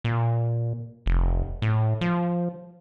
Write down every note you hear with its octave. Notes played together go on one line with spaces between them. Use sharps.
A#2
F1
A2
F3